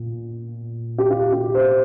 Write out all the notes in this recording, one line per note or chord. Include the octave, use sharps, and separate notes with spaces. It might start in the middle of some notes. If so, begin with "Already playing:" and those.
Already playing: A#2
G4
F4
G4
C5